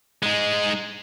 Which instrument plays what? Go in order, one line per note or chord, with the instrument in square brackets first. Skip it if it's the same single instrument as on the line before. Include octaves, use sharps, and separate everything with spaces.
[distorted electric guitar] G#3 D#4